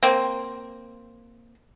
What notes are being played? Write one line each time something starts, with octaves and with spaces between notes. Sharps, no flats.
A#3 C4